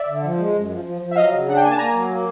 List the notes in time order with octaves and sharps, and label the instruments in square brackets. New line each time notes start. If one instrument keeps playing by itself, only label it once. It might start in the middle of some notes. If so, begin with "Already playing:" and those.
Already playing: [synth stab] D5 E5
[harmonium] D3
F3
G#3
F#2
F3
F3
F3
[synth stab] E5
[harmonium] F#3 [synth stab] D#5 F5
[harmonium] C#3
[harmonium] D4 [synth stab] F#5
[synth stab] G5
[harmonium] A#3 [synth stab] G#5
[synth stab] A5
[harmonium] A#3 [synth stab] G#5 A#5
[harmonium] F#3
A#3